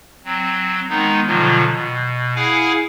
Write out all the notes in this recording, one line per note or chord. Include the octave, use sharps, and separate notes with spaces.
F#3 C4
D#3 G#3 B3 D#4
B2 D3 D#3 F3 F#3 F4
B2
E4 G#4 F5 F#5 G#5